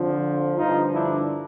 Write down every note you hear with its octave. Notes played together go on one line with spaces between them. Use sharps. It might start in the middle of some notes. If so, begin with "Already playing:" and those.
Already playing: F2 D3 F3
G2 D3 F3 D#4 F4
D4 E4